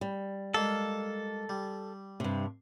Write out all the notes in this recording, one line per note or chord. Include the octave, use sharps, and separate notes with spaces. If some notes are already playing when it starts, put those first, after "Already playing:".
G3
G#3 A#3 A4 F5
G3
G2 C3